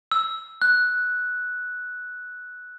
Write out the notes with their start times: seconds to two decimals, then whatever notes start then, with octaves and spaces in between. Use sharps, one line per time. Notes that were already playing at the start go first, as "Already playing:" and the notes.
0.12 E6
0.62 F#6